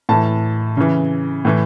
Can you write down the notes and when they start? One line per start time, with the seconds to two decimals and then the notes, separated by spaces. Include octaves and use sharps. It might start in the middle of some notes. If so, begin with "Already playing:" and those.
0.09 A2 E3 A5
0.77 C#3 E3
1.45 A2 E3